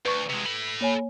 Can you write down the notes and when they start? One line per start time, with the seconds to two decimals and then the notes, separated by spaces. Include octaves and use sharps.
0.05 D2 B4 C#6
0.30 C3 G#3
0.46 A4 B5
0.81 A#3 C#5 G#5